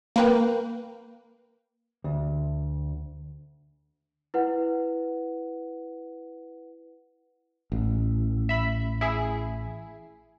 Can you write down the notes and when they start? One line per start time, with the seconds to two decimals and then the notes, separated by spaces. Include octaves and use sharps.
0.16 A#3 B4 G5
2.04 D2
4.34 E4 B4 F#5
7.72 A1
8.49 E5 B5
9.01 E4 G#4